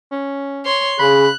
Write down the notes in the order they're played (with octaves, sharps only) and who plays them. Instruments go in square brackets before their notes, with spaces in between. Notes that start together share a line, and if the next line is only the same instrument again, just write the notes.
[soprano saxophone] C#4
[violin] C#5 C6
[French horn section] C#3 G#4 [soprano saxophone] B5 [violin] F#6